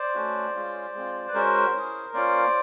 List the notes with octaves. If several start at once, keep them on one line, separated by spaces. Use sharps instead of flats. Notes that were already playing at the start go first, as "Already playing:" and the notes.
Already playing: C5 D5
A3 C#4 F#4
G#3 C#4 F4
G#3 C4 F4
B4
G#3 C#4 F#4 A#4 C5
C#4 E4 G#4
A#3 C#4 F4 C5 D5